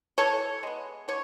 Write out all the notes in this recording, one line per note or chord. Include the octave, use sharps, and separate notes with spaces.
E3 A4 C#5
G#3 B3
D3 C#5